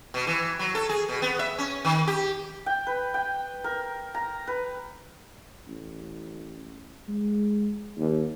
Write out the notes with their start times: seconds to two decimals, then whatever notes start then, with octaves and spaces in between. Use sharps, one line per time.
0.14 B2
0.27 E3
0.59 F#3
0.75 A4
0.89 G#4
1.09 B2
1.22 B3
1.39 E5
1.58 C#4
1.85 D#3
2.07 G4
2.66 G5
2.87 B4
3.14 G5
3.64 A#4
4.15 A#5
4.47 B4
5.68 A1
7.08 G#3
7.98 D#2